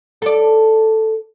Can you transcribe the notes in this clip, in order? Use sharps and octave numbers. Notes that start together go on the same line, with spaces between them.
A4 D5